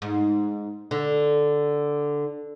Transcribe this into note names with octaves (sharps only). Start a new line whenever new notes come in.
G#2
D3